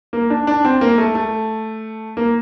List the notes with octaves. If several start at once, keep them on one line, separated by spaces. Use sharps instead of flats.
A#3
D4
D4
C4
A#3
A3
A3
A#3